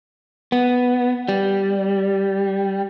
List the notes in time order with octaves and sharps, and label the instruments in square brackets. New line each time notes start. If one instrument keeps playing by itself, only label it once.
[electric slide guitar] B3
G3